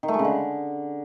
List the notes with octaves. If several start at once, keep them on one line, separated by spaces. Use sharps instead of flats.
D#3
A3
G#3
C#3
D3